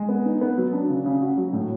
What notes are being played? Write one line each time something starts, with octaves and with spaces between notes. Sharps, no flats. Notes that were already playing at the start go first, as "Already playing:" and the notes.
Already playing: G#3
B3
D#4
B3
F#3
D4
C#3
C#3
F#4
F#3
A2